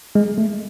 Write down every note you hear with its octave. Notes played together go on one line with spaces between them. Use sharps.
G#3
A3